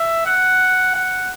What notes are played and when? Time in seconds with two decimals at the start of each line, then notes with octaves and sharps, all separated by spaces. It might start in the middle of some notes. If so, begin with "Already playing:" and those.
Already playing: E5
0.26 F#5
0.94 F#5